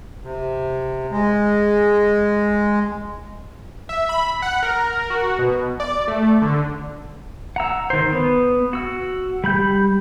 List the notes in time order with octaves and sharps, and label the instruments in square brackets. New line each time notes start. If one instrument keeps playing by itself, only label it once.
[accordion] C3
G#3
[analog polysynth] E5
B5
F#5
A#4
F#4
B2
D5
A3
D3
[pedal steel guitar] F#5 A#5 E6
D#3 C5
B3
F#4 E6
G3 B5 G6